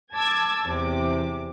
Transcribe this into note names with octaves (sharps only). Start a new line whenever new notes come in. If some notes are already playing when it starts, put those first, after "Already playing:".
A5 D6 E6 G#6 A6
E2 C3 D6